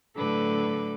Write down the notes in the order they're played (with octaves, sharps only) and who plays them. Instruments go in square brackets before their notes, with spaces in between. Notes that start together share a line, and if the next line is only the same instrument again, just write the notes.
[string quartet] A2 D3 F#3 A4 B4 D6